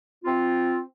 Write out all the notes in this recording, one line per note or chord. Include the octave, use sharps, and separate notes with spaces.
C4 F4